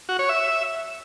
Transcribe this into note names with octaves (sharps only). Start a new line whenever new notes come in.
F#4
C#5
E5